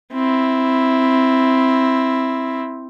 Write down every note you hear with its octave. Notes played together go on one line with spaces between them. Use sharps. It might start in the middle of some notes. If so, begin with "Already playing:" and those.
C4 E4